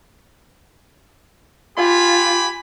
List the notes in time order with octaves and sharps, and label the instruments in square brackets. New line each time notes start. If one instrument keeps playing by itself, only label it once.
[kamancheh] F4 [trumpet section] G4 G#5 B5